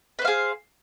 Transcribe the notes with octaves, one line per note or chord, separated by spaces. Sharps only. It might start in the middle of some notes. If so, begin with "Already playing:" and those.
G#4 B4 C5 F5